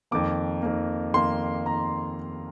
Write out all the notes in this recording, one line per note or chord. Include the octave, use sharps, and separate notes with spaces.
F2 D#3 A#3 D6
F2 D#3 A#3
F2 D#3 A#3 C6
D#3 A#3 A#5